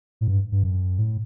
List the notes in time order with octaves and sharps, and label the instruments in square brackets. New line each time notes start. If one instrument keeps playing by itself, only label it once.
[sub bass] A2
G2
G2
F#2
A2